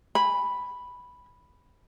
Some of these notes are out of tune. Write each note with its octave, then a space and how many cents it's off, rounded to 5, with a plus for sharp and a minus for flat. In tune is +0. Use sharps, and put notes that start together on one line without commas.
G#5 -25 B5 +0